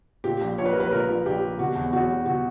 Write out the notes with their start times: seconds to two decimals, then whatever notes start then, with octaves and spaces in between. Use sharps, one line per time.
0.24 A#2 G4
0.41 A#1
0.58 A#1 C#5
0.65 B4
0.73 G3 A#4
0.80 B4
0.91 A#2 A#4
1.08 A#1
1.26 A#1 G4
1.42 G3
1.59 B2 F#4
1.75 E2
1.93 E2 F#4
2.10 G3
2.26 B2 F#4